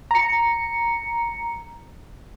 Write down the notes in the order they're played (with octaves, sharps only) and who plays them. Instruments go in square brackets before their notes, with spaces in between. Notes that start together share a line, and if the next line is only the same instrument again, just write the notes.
[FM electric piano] A#5 C#7